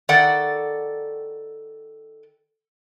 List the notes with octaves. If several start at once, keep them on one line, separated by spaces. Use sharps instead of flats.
D#3 A4 D5 F#5